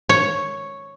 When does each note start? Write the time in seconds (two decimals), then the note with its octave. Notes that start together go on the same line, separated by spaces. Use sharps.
0.09 C#5